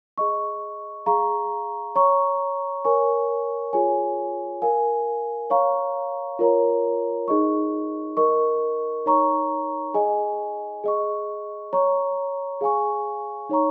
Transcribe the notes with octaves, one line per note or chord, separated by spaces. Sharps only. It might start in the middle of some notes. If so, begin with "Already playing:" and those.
G#4 D#5 C#6
G#4 F5 A#5 C#6
C#5 A#5 C#6
A#4 C#5 G#5 C#6
F4 G#4 C#5 G#5
A#4 F5 G#5
C#5 F5 A#5 C#6
F4 A#4 C#5 A#5
D#4 G#4 D#5 C#6
A#4 D#5 C#6
D#4 C#5 A#5 C#6
G#4 D#5 G#5
G#4 D#5 C#6
C#5 A#5 C#6
G#4 F5 G#5 C#6
D#4 C#5 A#5 C#6